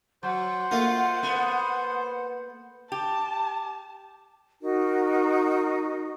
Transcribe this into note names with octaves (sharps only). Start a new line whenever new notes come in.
F#3 C5 F#5
A3 A#3 F4
B3
G4 A5
D#4 F#4 A#4